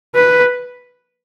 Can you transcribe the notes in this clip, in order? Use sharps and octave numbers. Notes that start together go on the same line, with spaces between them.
B4